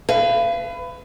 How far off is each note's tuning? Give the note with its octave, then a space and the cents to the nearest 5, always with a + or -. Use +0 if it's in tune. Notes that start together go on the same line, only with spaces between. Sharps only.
B4 +20 F5 -35